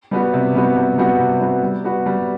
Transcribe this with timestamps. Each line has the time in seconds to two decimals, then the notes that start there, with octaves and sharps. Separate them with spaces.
0.11 G3 B3 F#4
0.33 C3
0.55 G3 B3 F#4
0.76 C3
0.98 G3 B3 F#4
1.19 C3
1.41 G3 B3 F#4
1.63 G3
1.84 B3 F#4
2.06 G3